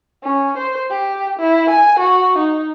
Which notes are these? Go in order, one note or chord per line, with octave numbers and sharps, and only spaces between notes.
C#4
C5
G4
E4
G#5
F#4
D#4